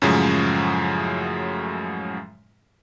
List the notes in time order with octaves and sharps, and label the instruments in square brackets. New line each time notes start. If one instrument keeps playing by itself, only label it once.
[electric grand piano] F#2 A2 C#3 F3 F#3 G#3